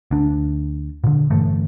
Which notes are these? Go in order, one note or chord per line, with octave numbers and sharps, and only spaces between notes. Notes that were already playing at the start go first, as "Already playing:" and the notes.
D2 D4
A#2 D3
G2 D3 E3 A3